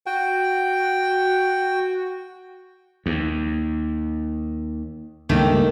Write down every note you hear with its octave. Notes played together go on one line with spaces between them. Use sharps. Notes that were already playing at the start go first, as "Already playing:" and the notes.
F#4 G5
D#2
C#2 G2 D#3 A3 A#3 G4